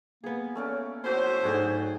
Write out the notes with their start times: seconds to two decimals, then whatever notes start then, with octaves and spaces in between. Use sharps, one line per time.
0.24 A#3 B3 G#4
0.55 A3 C#4 D5
1.04 A2 F3 F#4 C5 C#5 G#5
1.44 G#2 F#3 A3 D4 G#4 G5